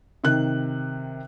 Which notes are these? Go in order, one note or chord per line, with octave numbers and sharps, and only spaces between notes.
C3 D#3 F#6